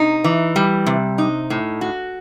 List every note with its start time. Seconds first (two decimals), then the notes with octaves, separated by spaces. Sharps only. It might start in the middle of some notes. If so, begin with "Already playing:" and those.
Already playing: C3 D#4
0.24 E3
0.56 G3
0.86 C3
1.18 D#4
1.50 A2
1.81 F#4